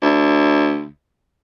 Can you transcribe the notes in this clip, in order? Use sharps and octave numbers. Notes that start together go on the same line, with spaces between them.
D2